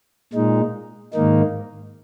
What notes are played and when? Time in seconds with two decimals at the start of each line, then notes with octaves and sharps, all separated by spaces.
0.33 A#2 G#3 D#4
1.13 G#2 D#3 A#3 D#4